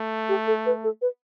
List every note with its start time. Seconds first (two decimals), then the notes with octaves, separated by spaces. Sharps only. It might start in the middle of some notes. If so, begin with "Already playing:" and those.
Already playing: A3
0.29 G4
0.47 A4
0.66 B4
0.84 A4
1.02 B4